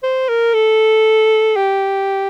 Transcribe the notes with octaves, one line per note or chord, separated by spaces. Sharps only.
C5
A#4
A4
G4